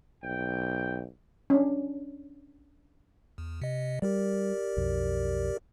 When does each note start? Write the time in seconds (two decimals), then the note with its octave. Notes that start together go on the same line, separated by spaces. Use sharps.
0.23 B1 G5
1.50 C#4 D4
3.38 E2
3.62 C3 D#5
4.02 G3 G4 A#4 D5
4.77 B1 F2